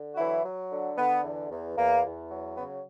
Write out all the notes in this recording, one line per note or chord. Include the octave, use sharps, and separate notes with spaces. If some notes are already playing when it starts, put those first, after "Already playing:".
Already playing: D3
F#4
E3 F#3 E4
F#3
D3
D3 B3
E2
E2
E2 A#3
E2
F#3
C#3 B3